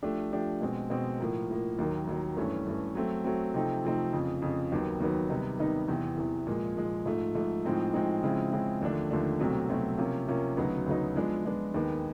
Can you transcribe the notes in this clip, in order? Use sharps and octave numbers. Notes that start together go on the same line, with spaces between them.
F3 A3 D4 G4
F3 A3 D4 G4
B2 G#3 C4
B2 G#3 C4
A2 F3 A#3
A2 F3 A#3
D#2 D#3 F#3 A#3
D#2 D#3 F#3 A#3
G2 E3 A3 C#4
G2 E3 A3 C#4
F#3 A3 C4
F#3 A3 C4
C3 F3 A3 C4 D#4
C3 F3 A3 C4 D#4
F2 C#3 F3
F2 C#3 F3
D#2 D#3 F#3 B3
D#2 D#3 F#3 B3
C3 D#3 G3 B3 D#4
C3 D#3 G3 B3 D#4
E2 C3 E3
E2 C3 E3
A#2 F3 G#3
A#2 F3 G#3
G#2 F3 A3
G#2 F3 A3
A2 F3 G#3 C4 D#4
A2 F3 G#3 C4 D#4
C#3 F3 G#3 C4 E4
C#3 F3 G#3 C4 E4
D#2 D3 F3 A3 D4
D#2 D3 F3 A3 D4
C2 B2 F#3 A3 C4
C2 B2 F#3 A3 C4
C3 F3 A#3 C#4 F4
C3 F3 A#3 C#4 F4
D2 C#3 F#3 B3 D#4
D2 C#3 F#3 B3 D#4
F3 G#3 B3 D4
F3 G#3 B3 D4
D#2 D#3 G#3 B3